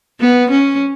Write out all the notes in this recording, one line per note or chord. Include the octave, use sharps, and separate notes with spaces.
B3
C#4